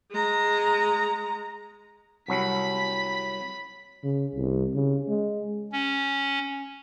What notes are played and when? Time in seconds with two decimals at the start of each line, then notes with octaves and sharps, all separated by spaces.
0.12 G#3 A#5
2.28 C2 F#3 B5 B6
4.03 C#3
4.35 C2
4.75 C#3
5.08 G#3
5.72 C#4